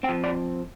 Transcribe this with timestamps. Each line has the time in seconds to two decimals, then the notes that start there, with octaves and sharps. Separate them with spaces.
0.03 C4 G5
0.09 F3
0.24 D5